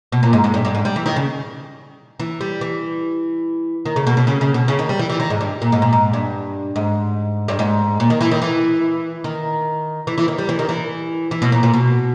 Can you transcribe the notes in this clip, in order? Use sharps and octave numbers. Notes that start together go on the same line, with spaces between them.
B2
A#2
G#2
G#2
G2
G2
G#2
G3
E3
D#3
C#3
E3
G3
E3
D#3
C#3
B2
B2
C#3
C#3
B2
C#3
D#3
G3
E3
E3
D#3
G#2
G2
A#2
G#2
A#2
G#2
G2
G#2
G2
G#2
A#2
D#3
E3
D#3
E3
D#3
E3
E3
D#3
G3
E3
D#3
E3
E3
B2
A#2
A#2
B2